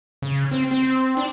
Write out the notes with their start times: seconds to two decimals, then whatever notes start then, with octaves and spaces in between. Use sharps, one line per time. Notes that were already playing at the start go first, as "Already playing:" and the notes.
0.22 C#3
0.51 C4
0.71 C4
1.17 D4